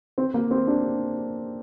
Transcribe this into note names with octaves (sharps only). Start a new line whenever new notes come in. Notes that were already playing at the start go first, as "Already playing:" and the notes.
C4
A#3
C4
D4